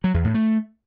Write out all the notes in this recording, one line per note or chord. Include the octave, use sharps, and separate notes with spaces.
F#3
E2
A2
A3